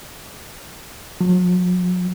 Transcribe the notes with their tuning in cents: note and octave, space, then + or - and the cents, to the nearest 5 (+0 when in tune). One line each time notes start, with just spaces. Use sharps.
F#3 -45